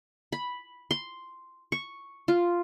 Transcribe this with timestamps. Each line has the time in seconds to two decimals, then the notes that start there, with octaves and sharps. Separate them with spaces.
0.32 B5
0.91 C6
1.72 C#6
2.28 F4